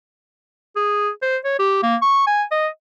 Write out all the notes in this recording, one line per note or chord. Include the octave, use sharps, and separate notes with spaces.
G#4
C5
C#5
G4
A#3
C#6
G#5
D#5